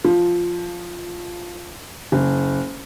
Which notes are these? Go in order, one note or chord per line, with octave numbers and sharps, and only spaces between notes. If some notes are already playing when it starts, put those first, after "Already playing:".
F3
F#1